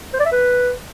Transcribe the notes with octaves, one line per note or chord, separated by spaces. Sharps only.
C5
D5
E5
B4